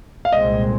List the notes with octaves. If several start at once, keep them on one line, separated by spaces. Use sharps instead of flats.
F5
C2 A#2 G#3 C4 D#5